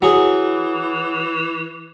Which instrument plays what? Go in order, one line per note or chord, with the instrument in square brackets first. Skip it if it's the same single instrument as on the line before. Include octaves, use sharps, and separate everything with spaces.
[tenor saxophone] E3 [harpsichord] F#3 G#4